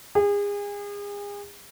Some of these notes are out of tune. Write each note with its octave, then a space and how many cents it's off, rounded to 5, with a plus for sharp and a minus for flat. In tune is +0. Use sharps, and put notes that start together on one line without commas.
G#4 -35